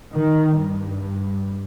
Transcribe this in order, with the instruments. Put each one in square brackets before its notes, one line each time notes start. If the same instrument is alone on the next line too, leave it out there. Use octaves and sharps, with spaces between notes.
[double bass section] D#3
G2